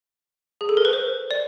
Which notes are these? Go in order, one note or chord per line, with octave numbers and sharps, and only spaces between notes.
G#4
A4
A#4
B4
C5
D5